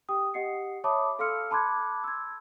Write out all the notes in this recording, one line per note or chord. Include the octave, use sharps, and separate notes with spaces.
G4 G5 D#6
G4 D#5 F#5 C7 C#7
C#5 E5 A5 B5 D6 D#6
A4 F5 C6 E6 F6 C#7
A5 B5 C6 D6 F#6 G#6
E6 G#6